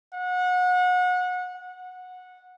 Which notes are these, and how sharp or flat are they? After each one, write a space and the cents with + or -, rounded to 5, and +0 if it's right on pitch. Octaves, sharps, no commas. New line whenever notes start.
F#5 -30
F#5 -15